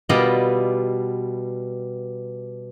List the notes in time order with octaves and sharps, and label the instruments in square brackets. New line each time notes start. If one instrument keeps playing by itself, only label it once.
[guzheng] B2 G3 B3 F4 D5 D#5